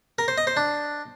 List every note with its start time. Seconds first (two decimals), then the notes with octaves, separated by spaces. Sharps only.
0.19 A#4
0.28 C5
0.38 D#5
0.47 C5
0.57 D4